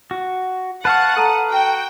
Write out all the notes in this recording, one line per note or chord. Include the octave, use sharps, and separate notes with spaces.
F#4
B4 F5 F#5 A5 C#6
A4 A5 A#5 D#6
F#4 G5